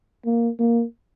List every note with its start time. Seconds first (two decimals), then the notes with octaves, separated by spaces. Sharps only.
0.26 A#3
0.60 A#3